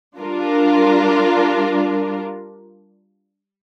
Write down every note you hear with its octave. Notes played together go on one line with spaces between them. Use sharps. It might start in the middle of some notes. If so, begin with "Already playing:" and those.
G3 D4 F4 A#4